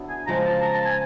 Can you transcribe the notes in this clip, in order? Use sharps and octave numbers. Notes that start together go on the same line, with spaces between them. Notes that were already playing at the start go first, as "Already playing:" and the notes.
Already playing: D3 F#3 B3 E4
G#5
C#3 F3 G#3 A#5
A5
A#5
A5
G#5